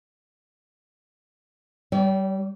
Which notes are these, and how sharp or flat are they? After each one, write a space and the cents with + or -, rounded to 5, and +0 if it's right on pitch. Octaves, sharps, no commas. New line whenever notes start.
G3 -20 C#5 +45